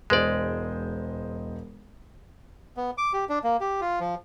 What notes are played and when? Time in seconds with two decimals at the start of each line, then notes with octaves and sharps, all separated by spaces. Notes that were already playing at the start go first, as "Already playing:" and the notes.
0.10 E1 G#3 C5 D5 D#5
2.77 B3
2.98 D6
3.13 G4
3.29 D4
3.44 A#3
3.60 G4
3.81 F4
4.00 F3